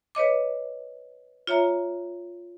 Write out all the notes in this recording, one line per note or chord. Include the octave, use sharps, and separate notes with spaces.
B4 C#5 D#5 D6
F4 C#5 E5 A#5